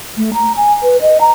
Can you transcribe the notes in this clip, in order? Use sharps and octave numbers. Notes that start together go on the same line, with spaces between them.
A3
A#5
G#5
B4
D#5
A#5